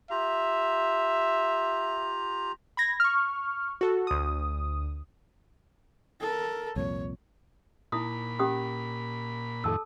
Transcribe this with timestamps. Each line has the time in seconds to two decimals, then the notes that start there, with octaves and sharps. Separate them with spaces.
0.10 F4 G4 E5 A#5
2.77 B5 G#6 A#6
3.00 C#6 F6
3.81 F#4 A4
4.07 D2 D#6
6.21 A4 A#4
6.76 C2 F2 A#2 C#5
7.92 A#2 D#4 E4 B5 D#6
8.39 C#4 G4 D#6
9.64 F2 A2 D#3 A4 A5 E6